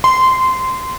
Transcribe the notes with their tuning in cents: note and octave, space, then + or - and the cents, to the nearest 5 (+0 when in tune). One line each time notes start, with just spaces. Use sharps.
C6 -15